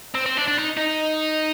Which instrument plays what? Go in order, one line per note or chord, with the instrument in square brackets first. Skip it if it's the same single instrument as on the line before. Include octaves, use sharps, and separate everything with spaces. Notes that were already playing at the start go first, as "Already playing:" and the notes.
[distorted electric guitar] C4
C4
D4
D4
D#4
D#4